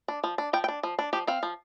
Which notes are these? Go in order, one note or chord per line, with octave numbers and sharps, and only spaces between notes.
D4
F3
D4
F3 G5
G5
D4
F3
D4
F3 G4
C4 F5
F3